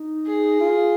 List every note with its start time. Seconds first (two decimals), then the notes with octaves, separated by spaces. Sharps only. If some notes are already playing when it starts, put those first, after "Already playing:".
Already playing: D#4
0.27 G#4
0.60 F4